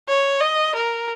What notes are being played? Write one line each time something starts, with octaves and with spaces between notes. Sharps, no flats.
C#5
D#5
A#4